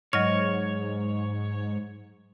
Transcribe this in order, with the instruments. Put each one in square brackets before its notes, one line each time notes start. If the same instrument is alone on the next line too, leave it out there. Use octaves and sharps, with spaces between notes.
[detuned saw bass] G#2 [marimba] F#3 D#5 F6 [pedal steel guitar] C#5